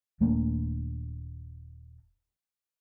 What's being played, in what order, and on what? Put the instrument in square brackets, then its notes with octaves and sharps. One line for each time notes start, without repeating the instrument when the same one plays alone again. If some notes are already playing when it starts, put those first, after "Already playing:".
[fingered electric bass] D#1 A3 A#3 D4